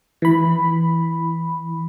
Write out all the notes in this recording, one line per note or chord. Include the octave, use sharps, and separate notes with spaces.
E3 B5